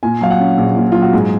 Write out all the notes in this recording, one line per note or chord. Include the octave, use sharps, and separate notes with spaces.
A#2 G#5
F#3 F5
F#5
C#4
A#1
A#2
F#3 F4
F#4
G#2 G#4